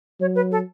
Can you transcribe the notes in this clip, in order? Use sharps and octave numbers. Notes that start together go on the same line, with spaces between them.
F#3 C#5
B4
A4